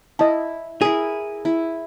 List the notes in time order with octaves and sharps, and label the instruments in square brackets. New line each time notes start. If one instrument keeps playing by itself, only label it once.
[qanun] E4 [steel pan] D#5 A5
[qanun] E4 A#4 [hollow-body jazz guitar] G#4
[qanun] E4